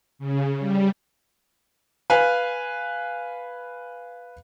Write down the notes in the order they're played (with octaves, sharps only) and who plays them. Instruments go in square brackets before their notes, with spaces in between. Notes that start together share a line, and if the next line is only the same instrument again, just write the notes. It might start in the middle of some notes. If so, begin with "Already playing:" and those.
[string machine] C#3
G3
[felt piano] B4 F5 G#5